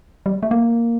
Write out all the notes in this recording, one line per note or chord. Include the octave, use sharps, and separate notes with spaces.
G3
A3
A#3